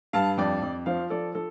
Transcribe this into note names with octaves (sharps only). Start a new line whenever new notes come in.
G2 F5 A5
F2 D5 G5
F2
F3 C5 F5
F3 A4 D5
F3 A4